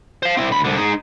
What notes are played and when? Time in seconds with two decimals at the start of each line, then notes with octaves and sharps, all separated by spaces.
0.23 C5 F5
0.37 C4 E4
0.51 D2 B5
0.64 C2 D3
0.78 D#4 G#4